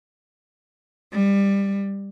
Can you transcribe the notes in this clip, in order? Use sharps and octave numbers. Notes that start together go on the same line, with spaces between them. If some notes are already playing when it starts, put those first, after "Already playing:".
G3